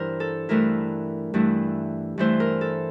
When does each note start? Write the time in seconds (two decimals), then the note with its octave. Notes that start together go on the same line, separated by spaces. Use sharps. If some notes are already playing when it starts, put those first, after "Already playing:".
Already playing: G2 E3 E4 A#4 C5
0.20 A4
0.49 G2 E3 A3 E4 A#4
1.34 G2 E3 A3 E4
2.18 G2 E3 A3 E4 C5
2.40 A#4
2.61 A4